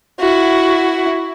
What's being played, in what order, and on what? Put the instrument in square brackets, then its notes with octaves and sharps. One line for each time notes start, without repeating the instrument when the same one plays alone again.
[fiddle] E4 F#4